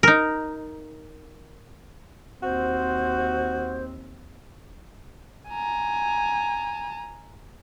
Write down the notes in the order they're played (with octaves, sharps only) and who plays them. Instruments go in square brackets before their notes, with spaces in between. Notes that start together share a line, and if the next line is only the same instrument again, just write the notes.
[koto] D#4 A#4
[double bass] D#2 C4 [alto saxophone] F#4 [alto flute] C5
[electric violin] G#5 A#5